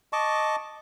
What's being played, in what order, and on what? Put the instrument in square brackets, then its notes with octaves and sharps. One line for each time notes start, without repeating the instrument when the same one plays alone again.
[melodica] D#5 A5 C#6 D6